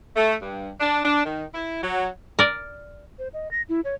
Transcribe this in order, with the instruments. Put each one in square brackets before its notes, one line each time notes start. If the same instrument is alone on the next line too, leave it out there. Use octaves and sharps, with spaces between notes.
[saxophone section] A3
G2
D4
D4
D#3
E4
F#3
[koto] A#4 D5
[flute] C5
D#5
A#6
E4
C#5